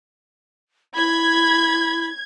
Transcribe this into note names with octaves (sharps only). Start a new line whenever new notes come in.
E4 B5 G#6